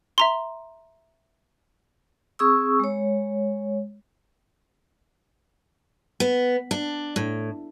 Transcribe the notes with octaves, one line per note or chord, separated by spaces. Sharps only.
E5 A#5 C6
C4 G#4 C#6 D#6 E6
G#3 C#5
B3
D4
A2